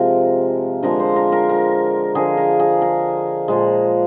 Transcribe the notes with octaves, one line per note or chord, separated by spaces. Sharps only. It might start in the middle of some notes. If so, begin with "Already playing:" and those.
Already playing: C3 F3 G#3 A#4
D3 F3 G#3 A#4
C5
A#4
A#4
A#4
D3 F3 G#3 G#4
A#4
G#4
A#4
A#2 F3 G#3